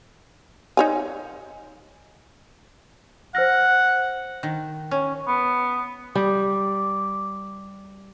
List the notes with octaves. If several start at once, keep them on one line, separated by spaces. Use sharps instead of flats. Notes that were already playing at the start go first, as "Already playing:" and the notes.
D#4 C#5 G#5
C5 F#5 F6 A#6
D#3
C#4
B3
G3 D6